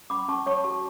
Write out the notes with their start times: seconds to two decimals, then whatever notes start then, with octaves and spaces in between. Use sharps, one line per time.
0.10 C#4 B5 D6
0.28 C#4 A5 C#6
0.46 C#5 A5 C#6
0.64 F#4 A5 C#6